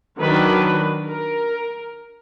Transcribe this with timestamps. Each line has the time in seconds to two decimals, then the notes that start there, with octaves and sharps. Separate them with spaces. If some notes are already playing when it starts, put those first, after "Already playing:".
0.19 D#3 F#3 D4 B4
1.08 A#4